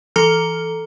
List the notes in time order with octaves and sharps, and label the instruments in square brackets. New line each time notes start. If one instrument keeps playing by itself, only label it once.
[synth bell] E3 A4 A#5 F6